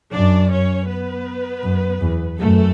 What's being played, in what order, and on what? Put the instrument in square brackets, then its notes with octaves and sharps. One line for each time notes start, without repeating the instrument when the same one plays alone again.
[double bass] F#2 [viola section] D4 D5
[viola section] C#4 C#5
B3 B4
[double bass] F#2
E2
[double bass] F#2 [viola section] A3 A4